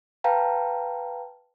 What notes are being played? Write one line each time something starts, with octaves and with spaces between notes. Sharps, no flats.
B4 F5 G5 A5 A#5